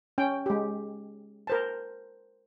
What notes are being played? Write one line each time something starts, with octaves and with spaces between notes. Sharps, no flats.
C#4 G5
G#3 G4
A#4 C5 A5